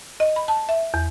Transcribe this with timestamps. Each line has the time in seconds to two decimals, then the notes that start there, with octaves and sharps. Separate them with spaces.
0.20 D#5
0.36 B5
0.48 A5
0.69 E5
0.94 E2